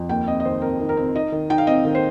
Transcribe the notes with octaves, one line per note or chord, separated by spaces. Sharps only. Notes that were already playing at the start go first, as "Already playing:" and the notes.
Already playing: F2
D#2 G5
C4 D#5
D#5
D#3 C5
C4 A#4
D#3
A#4
C4
D#4 D#5
D#3
D#4 G5
F5
C4 D#5
D#3
C5